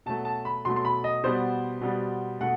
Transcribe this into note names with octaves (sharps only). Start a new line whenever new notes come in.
B2 F#3 A3 A5
A5
B5
B2 F#3 A3 C6
C6
B5
D#5
B2 G3 B3 C5
B2 G3 B3
B2 A3 F#5